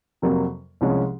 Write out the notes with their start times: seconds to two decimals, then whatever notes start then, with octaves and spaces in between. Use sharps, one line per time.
0.22 F2 C3 F#3 A#3
0.81 C2 C3 F3 G#3 C#4